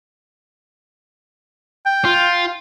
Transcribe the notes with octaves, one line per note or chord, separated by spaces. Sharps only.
G5
F4